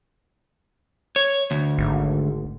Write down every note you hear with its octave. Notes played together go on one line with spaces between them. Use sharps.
C#5
D2
G#1